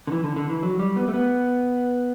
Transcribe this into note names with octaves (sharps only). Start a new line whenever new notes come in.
D3
E3
D3
D3
E3
F#3
G3
B3
A3
B3